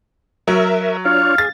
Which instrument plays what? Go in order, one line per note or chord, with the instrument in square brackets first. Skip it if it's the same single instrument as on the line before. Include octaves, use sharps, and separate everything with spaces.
[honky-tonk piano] F#3 [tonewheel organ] A#4 E5
[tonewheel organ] D4 F4 C#5 [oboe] F5
[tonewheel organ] G#4 [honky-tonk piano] A6